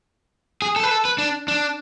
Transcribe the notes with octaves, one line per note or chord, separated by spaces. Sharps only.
G#4
A4
B4
A4
B4
D4
D4